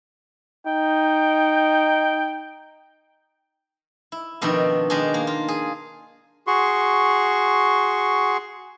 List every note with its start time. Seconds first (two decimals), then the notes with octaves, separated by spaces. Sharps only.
0.66 D#4 G5
4.12 E4
4.41 F2 B2 D#3 D4 D5
4.90 D#3 G#3 D4
5.14 A#3
5.27 F4
5.48 G#4
6.47 F#4 G#4 C6 C#6